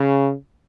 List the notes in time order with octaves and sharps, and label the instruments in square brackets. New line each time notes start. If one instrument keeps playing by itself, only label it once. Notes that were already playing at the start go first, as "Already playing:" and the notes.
Already playing: [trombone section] C#3